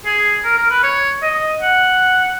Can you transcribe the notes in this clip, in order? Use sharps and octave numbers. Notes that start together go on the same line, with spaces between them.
G#4
A#4
A#4
B4
C#5
D#5
F#5